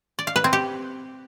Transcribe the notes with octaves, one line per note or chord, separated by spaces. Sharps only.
D5
F5
B4
C4
G4